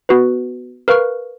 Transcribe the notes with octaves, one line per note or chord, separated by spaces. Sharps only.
B3 F#4 B4
A#4 B4 F5 C#6 F6